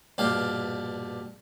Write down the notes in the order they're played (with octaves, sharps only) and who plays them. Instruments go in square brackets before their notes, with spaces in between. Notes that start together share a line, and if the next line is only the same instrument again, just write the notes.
[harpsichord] A#1 G2 B2 G4 F5